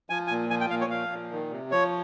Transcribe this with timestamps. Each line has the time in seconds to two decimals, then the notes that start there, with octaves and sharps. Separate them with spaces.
0.10 F3 G#5
0.27 G#5
0.30 A#2
0.50 F3 G#5
0.61 G5
0.70 A#2 F5
0.81 C#5
0.90 F3 F5
1.11 A#2
1.31 D#3
1.51 C3
1.71 F3 C#5